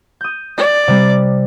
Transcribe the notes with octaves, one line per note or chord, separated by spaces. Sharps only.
D#6 G6
D5
C3 G3